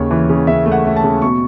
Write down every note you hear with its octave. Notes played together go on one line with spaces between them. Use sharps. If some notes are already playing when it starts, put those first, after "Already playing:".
Already playing: D#2 C#3 C#5
E3
C#3
C#3 E5
A3
F#5
A3
A5
C#3
B2 C#6